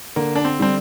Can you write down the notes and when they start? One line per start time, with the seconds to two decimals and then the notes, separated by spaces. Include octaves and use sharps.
0.16 D3 A#3
0.36 D4
0.45 C4
0.60 G3 C4